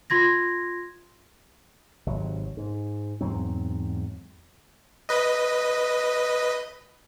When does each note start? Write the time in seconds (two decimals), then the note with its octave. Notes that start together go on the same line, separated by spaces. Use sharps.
0.10 F4 C6 G#6 A#6
2.07 G#1 C3 F#3
2.57 G#2
3.21 E2 G#2 F#3 C4
5.09 B4 D#5